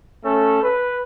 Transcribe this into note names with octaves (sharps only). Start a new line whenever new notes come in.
A3 C#4 A4
B4